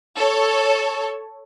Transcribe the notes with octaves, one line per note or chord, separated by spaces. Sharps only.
A4 C#5